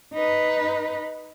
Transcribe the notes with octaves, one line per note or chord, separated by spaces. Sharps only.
D#4 B4